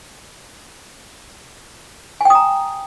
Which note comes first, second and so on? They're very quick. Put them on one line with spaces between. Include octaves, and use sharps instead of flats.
G#5 G5 D#6 A#5